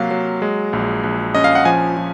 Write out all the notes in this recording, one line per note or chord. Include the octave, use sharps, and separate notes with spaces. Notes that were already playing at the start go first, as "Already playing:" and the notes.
Already playing: C3 F#3 A#3 F5
F#3
G#3
A#1
A#1
C#4 D#5
F5
F#5
F3 G#5
F3